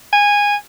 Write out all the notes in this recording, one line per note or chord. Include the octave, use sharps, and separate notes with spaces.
G#5